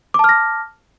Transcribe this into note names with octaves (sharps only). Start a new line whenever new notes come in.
A5 D6 F6 A#6